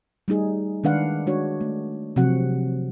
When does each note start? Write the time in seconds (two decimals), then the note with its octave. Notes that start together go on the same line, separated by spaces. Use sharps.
0.28 G3 A3 D#4 G#4
0.84 D#3 G#3 D4 B4 F5 F#5
1.27 G#3 D4 F#4 C#5
1.61 A3
2.16 C3 F3 F#3 C4 F#4 F#5